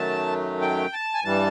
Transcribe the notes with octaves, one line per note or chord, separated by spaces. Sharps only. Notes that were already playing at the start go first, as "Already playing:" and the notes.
Already playing: F#2 D#3 F#3 A3 A5
G5
A5
G#5
G2 E3 G3 A5